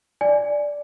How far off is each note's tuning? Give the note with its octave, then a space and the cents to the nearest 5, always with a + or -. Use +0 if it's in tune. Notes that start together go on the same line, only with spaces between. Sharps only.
D5 +0 G#5 +0